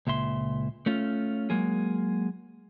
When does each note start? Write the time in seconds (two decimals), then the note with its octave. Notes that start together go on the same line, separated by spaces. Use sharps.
0.07 C#2 A#2 E5 C6
0.86 A3 C#4 F4
1.50 F#3 G#3 A#3 G#4